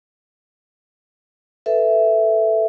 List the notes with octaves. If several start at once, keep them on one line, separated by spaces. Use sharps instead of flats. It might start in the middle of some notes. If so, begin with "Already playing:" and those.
A4 B4 E5